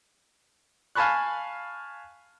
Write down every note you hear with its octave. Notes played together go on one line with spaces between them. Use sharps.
F5 G#5 A5 B5 C#6 F#6